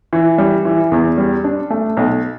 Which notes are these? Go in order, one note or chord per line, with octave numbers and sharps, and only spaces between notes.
E3
G3
E3
E2
G3
D4
A3
B1